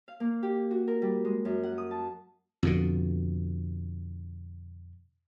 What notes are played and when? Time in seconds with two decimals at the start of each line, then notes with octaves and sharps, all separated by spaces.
0.08 F5
0.20 A#3
0.43 G4
0.71 F#4
0.88 A#4
1.02 G3
1.25 G#3
1.45 F#2
1.63 F#5
1.78 D#6
1.91 A5
2.63 F2 B2 D3